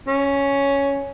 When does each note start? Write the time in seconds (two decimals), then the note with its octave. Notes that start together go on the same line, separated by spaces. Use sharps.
0.08 C#4